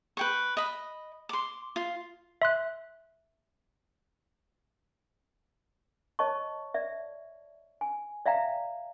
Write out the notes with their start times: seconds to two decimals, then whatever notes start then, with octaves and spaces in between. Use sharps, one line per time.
0.17 B4 G5 C#6
0.57 D#5 B5
1.29 C6 D6
1.76 F4
2.42 E5 C6 F#6
6.19 C#5 D#5 A5 C#6
6.74 D5 E5
7.81 G#5
8.26 D5 E5 F5 G5 A#5